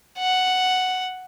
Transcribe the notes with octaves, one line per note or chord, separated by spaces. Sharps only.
F#5